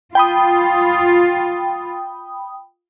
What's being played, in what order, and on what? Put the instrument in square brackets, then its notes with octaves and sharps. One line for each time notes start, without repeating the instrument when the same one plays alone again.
[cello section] F4 [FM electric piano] G5 B5 D#6